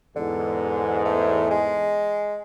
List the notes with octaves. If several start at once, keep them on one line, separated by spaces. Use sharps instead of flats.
E2 G#2 D3
A3
G#3